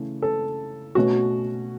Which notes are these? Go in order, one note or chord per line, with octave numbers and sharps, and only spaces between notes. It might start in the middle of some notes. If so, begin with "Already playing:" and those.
Already playing: C#3 E3 A3
A4
B2 A3 C#4 F#4